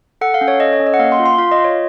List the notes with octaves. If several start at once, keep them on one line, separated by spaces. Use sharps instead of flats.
A4 F#5
F5
C#4
C#5
A4 D#5
C#5
C#4
D#5
F#5
A#3 F5
C6
F4
C6
F4 F5
D#5
F4
C#5